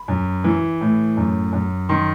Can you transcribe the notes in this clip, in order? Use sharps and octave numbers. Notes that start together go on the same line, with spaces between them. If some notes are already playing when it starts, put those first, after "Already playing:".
Already playing: B5
F#2
E3
A2
F#2
F#2
D#3 C6